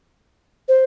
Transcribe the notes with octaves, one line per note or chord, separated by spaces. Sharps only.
C5